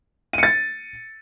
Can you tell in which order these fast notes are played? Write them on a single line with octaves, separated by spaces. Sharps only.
D#7 C#7 A6